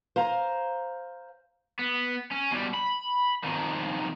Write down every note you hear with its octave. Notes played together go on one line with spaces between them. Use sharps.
C5 F5 G#5 A#5
B3
C#4
B2 G3
B5
F2 D#3